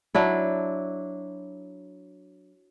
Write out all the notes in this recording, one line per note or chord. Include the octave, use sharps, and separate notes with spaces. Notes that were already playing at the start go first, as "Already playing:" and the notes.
F#3 D4 E4